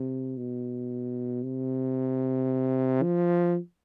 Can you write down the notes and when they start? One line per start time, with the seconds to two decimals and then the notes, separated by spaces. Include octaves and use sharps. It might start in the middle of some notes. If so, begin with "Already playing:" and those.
Already playing: C3
0.38 B2
1.43 C3
3.03 F3